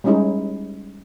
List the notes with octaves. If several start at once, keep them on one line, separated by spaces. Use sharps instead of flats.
G3 G#3 C#4 D#4 E4 G#4